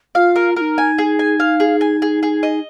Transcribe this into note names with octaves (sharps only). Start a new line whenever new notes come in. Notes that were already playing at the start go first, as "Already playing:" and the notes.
F4 F5
A#4
D#4 F4 A#4
G#5
G#4
G#5
F5
G#4
G#5
G#4
G#4
D#5